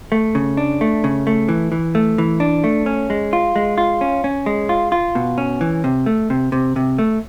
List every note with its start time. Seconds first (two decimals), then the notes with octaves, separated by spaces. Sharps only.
0.12 A3
0.35 C#3
0.57 D4
0.81 A3
1.04 C#3
1.27 A3
1.49 E3
1.72 E3
1.95 A3
2.18 E3
2.40 D4
2.64 A3
2.86 C#4
3.10 G#3
3.33 F4
3.56 G#3
3.78 F4
4.01 C#4
4.24 C#4
4.46 G#3
4.69 F4
4.92 F4
5.15 B2
5.38 C#4
5.61 E3
5.84 C3
6.06 A3
6.30 C3
6.52 C3
6.76 C3
6.98 A3